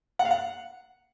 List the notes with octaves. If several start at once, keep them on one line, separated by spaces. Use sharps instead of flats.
F#5
F5
F#5